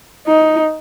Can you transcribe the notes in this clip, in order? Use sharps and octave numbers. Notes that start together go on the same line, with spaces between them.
D#4